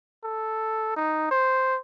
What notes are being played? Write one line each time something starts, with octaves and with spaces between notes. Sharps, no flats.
A4
D#4
C5